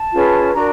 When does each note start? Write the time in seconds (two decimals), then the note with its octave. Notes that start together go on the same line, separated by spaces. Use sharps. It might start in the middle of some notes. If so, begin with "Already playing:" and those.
Already playing: A5
0.13 C#4 F4 G#4 B4
0.53 D4 F#4 A#4 A#5